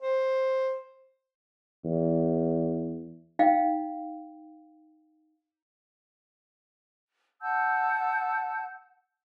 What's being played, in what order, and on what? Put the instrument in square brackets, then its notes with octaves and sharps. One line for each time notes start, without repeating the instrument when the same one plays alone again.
[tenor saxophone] C5
[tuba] E2
[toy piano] D#4 F5 G5
[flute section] F#5 A5 E6 G6